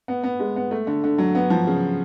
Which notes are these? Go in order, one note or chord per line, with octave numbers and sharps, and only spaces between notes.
B3
B3
G#3
B3
A3
D3
D3
F#3
B3
F3
C#3